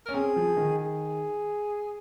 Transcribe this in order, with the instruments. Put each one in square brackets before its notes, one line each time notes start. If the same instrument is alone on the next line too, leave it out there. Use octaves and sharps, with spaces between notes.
[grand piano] C#4 [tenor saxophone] A#4
[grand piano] C4 [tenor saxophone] G#4
[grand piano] F3
D#3
[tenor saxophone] G#4